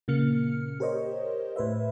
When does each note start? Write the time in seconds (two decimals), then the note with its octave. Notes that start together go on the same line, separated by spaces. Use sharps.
0.08 A#2 C#3 A#3 F6 C#7
0.80 G4 A#4 C5 C#5 D#5
1.56 A2 B4 C5 E5